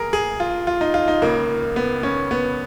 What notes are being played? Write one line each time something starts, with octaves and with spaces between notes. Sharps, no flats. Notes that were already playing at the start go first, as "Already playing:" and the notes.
Already playing: A#1 G#4 A#4
G#4
F4
F4
D#4
F4
D#4
C#2 C#3 A#3
B3
C#4
B3